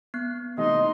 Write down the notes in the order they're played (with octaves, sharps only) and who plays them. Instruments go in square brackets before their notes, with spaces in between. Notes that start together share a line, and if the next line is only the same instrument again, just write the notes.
[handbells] B3 F#6
[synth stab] C3 E3 A3 [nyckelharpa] D#4 C6 [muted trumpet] D#5